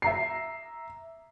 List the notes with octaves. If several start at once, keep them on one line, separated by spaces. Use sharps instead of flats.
E5 A#5 C7